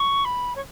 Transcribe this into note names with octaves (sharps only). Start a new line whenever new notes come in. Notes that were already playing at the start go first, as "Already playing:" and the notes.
Already playing: C#6
B5
C#5